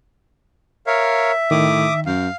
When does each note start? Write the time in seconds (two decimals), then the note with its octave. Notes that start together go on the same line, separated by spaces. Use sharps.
0.87 A#4 C#5 E5 F5
1.51 A2 D#3 D6 D#6
2.06 F#2 F5